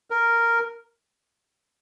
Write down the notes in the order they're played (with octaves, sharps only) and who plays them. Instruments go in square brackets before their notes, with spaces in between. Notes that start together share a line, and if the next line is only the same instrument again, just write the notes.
[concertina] A#4